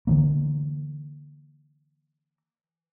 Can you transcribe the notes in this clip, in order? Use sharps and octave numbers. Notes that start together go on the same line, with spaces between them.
D3 E3 A#3